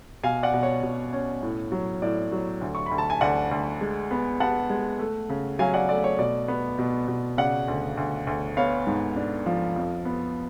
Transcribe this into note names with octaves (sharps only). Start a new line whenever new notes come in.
B2 F5 G#5
D5 F#5
B2
C#5
B2
C#4
A2
F#3
A2 D5
F#3
D2
C#6
D2 B5
A5
G#5
D2 D5 F#5
D2
G#3
B3
B3 F#5 A5
G#3
A3
C#3
F#3 F5 G#5
D5 F#5
A3 D5
C#5
B2 D5
B3
B2
B2
C#3 D5 F#5
D2
D2
D2
B3 C#5 F5
G#2
D4
F3
F2
B3